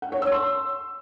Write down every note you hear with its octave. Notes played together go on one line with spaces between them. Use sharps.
F#5
C#5
E6
C6